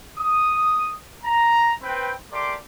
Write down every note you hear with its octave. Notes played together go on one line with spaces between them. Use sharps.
D#6
A#5
C4 B4 G5
A3 G4 A#4 D5 C6 D6